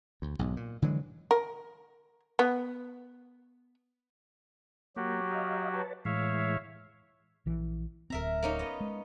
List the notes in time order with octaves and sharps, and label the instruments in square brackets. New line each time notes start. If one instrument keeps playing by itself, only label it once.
[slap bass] D2
B1 G#2
A#2
D3 E3 F#3 G#3
[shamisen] A#4
B3
[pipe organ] F#3 F#4 G4 [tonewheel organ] A#3
[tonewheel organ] D#5 F5
B4 C#5 A5
[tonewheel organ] A2 E3 G#3 [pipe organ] C#5 E5 F5
[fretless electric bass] A#1 E3
[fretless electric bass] D1 C4 [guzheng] A#4 E5 A#5
[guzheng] A#3 C#4 D#4
B3 D#5
[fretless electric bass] G#3